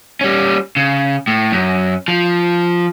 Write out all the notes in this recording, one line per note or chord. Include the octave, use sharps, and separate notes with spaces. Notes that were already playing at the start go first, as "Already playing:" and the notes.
G3 C#4
C#3
A2
F#2
F3